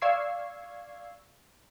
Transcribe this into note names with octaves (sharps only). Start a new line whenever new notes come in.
D5 F5 C#6 E6 G#6 C7